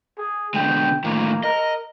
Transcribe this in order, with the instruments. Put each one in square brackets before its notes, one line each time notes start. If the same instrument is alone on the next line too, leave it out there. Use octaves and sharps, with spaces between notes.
[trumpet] G#4
[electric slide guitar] B2 D3 G#3 [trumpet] G5
[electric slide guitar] A2 D#3 F3 [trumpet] A#3
[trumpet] A#4 [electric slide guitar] D#5